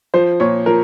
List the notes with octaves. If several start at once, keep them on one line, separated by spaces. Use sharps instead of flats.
F3 C5
A#2 C#5
F3 A#4